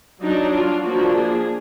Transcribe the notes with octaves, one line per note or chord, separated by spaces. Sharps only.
F#3 D4 D#4
F4
F3 A#3 D4 F#4
G#4